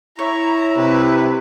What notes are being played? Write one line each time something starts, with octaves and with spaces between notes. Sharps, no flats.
E4 C#5 A#5
C3 B4